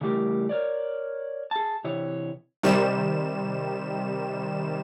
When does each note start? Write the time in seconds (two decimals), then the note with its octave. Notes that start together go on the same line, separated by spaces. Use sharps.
0.01 C#3 E3 G3 A3 G4 A#4
0.49 A#4 C#5 D5
1.51 G#4 A5
1.84 C3 E3 C#5
2.63 C3 D#3 G3 E7